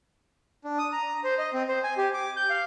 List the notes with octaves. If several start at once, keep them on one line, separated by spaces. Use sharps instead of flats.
D4
D#6
A#5
C5
D#5
C4
C5
G#5
G4
D6
G6
F5